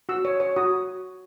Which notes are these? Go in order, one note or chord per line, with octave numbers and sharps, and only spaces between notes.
F#4 E6
C#5
C#5
F#4 D#6